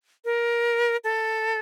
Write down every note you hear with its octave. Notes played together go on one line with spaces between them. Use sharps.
A#4
A4